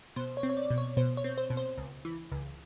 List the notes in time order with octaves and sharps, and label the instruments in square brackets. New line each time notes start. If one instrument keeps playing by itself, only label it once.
[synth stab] B2 C5
C#5
C4
C#5
D5
B2
C#5
B2 C5
C#5
C4
C5
B2
C5
C#2
E3
C#2